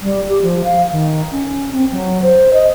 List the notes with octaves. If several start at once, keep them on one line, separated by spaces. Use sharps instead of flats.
G3
G4
F3
F5
D#3
C#4
C4
F#3
C5
D#5